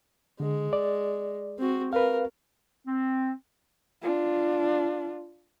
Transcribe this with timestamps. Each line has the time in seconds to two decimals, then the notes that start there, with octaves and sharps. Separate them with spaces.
0.40 D3 G#3
0.73 D5
1.59 C4 F#4
1.93 A#4 B4 F5
2.86 C4
4.02 D4 F4